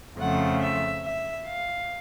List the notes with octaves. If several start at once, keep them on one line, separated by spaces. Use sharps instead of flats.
F2 C#3 F3 A3 F#5
E5
E5
F5